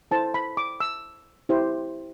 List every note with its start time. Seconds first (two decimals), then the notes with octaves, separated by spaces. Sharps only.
0.11 E4 A4 C5 A5
0.34 B5
0.57 D6
0.80 E6
1.49 E4 G4 C5